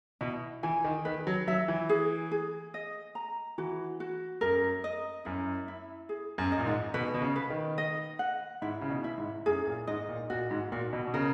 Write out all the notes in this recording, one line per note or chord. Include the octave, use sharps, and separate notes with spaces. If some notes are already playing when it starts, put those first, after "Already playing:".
B2 E4
E3 G#5
D#3
D#3 B4
F#3
F#3 E5
E3
G#4
G#4
D#5
A#5
E3 F#4
F#4
F#2 A#4
D#5
F#2 E4
E4
G#4
F#2
D#5
A#2
G#2
B2 B4
B2
C#3
B4
D#3
D#5
F#5
G#2 E4
C#3
B2
E4
G#2
F#2 G#4
A#2
G#2 D#5
A#2
A#2 F#4
G#2
A#2 F#4
B2
B2
C#3 A#4